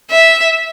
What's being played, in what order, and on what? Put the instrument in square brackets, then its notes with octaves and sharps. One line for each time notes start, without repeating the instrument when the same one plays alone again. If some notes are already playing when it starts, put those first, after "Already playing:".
[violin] E5